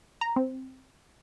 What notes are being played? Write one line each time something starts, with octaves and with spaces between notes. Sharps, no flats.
A#5
C4